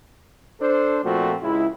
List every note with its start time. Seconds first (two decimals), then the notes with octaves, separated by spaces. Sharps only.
0.61 D4 A4 C5
1.03 A#2 F3 A3 C4 F#4
1.42 C#2 G#3 E4